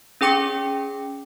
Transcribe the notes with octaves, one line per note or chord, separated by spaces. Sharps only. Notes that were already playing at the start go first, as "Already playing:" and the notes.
C#4 G#4 G5 D6 C#7